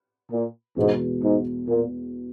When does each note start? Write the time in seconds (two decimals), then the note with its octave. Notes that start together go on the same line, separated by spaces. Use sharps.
0.31 A#2
0.76 E2 G#2 B2 G#3
1.22 G#2
1.68 A#2